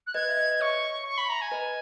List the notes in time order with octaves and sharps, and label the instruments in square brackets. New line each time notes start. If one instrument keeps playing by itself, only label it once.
[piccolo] F#6
[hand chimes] B4 D#5 [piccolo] G#6
[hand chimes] E5
B4 D#5
[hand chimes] C#5 E5 [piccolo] C#6
[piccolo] C#6
B5
A#5
G#5
[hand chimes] B4 D#5